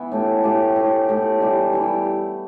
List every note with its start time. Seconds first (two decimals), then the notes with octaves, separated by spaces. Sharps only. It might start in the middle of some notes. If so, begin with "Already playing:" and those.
Already playing: E3 B3 E4
0.12 A2 A3 G4
0.44 A2 A3 G4
0.76 A2 A3 G4
1.08 A2 A3 G4
1.40 E3 G3 E4 G4
1.73 E3 G3 E4 G4